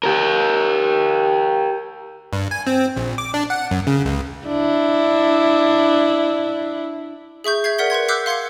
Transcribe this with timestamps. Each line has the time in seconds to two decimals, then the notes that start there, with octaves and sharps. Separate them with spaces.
0.03 G4 A#4
2.33 G2
2.51 G#5
2.67 C4
2.96 A#1
3.18 D6
3.34 D4
3.50 F#5
3.71 F#2
3.87 C#3
4.05 C#2
4.46 D4 E4
7.44 G#4 E5 C#6 G6
7.64 E5 G6 G#6 C7
7.78 A#4 D5 F#5 B6 G7
7.90 B4 F#5 C6 G#6
8.08 D6 E6 F#6 G6 B6 C7
8.26 F5 C6 G#6 C7 C#7